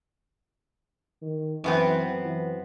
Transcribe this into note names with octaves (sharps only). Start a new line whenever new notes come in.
D#3
F#2 E3 B3 C4
E3